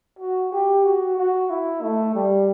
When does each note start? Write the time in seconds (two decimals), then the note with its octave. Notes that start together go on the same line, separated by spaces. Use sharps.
0.19 F#4
0.52 G4
0.85 F#4
1.17 F#4
1.50 E4
1.82 A3
2.15 G3